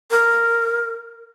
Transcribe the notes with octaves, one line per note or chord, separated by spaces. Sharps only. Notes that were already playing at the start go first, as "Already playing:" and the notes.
A#4